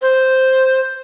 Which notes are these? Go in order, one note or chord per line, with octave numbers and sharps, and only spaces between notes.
C5